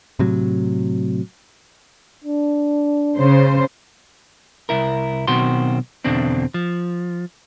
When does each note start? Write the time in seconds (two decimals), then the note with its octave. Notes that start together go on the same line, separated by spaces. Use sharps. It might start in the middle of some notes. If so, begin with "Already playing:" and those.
0.19 A2 C3 F#3
2.24 D4
3.18 C#3 C5
4.69 C2 E4 A#4
5.28 B1 B2 D#3 C4 F#4 C6
6.05 E2 B2 D3 C4 D4
6.54 F3